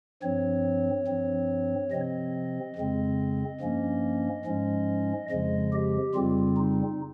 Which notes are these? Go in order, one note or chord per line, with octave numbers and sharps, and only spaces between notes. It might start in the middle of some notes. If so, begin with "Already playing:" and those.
G2 F3 C4 C#5
G2 F3 C4
C3 F3 C4 D#5
F2 C#3 G#3 C4
G2 F3 A#3 C#4
G#2 F3 G#3 C#4
F2 C#3 F3 G#3 D#5
G4
F2 C#3 G3 C4 F4
D#4